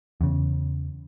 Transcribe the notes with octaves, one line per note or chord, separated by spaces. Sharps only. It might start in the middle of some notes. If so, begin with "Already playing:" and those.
E2 C#3